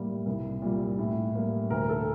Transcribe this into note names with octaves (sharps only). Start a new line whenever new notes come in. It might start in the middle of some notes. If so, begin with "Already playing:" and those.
Already playing: A2 G3 A#3
C2
A#2 G3
A2
G3 A#3
D2 A#4
A4